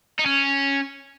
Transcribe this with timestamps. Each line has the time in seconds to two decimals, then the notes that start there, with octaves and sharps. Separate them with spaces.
0.19 D#4
0.26 C#4